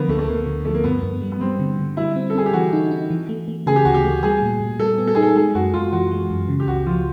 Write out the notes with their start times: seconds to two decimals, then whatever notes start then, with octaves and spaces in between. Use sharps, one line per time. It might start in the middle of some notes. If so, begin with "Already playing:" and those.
Already playing: D3 F3 A#3 B3
0.08 D2 A3
0.19 A3
0.28 D2 A#3
0.46 D3
0.65 F3 A3
0.74 A#3
0.84 G2 B3
1.03 G2
1.22 G3
1.32 B3
1.41 G3 C4
1.59 D3
1.78 D3
1.97 G3 E4
2.16 C4
2.30 A4
2.35 C4 G#4
2.46 G4
2.53 E3 F#4
2.73 D#4
2.91 D#4
3.10 E3
3.29 A3
3.48 A3
3.66 C#3 G#4
3.76 G4
3.85 D2 F#4
3.94 G4
4.04 A3
4.23 G3 G#4
4.42 A#2
4.60 A#2
4.79 G3 A4
4.98 B3
5.07 A4
5.15 D#4 G#4
5.22 A4
5.35 G#3 G#4
5.55 F#2 F#4
5.73 F#2 F4
5.92 E3 F#4
6.11 G#3
6.30 F#2
6.48 C#3
6.60 G4
6.67 C#2 F#4
6.86 F3 F4